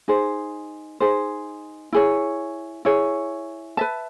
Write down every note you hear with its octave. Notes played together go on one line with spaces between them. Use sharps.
D#4 G#4 C5
D#4 G#4 C5
E4 G#4 C#5
E4 G#4 C#5
B4 E5 A5